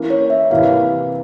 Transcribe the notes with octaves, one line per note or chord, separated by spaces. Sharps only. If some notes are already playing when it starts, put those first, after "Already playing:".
Already playing: E3 A#3 C#4 E4
C#5
E5
C3 E3 A#3 F5